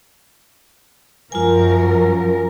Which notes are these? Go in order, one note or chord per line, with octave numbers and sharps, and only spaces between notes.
F#2 F3 F4 A#4 G#5